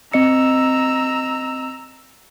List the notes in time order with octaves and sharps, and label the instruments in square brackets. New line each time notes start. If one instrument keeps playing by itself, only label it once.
[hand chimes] C4 D#5 C#7 [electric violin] A#5 E6